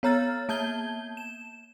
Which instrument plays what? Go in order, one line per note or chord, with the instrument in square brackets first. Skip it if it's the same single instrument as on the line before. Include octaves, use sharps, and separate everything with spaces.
[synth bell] B3 C#5 A#5 F6 A6
A#3 A5 G6 G#6 G7
E7